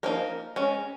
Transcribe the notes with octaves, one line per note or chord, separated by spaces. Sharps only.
F3 A#3 D#4 A#4
G#3 C#4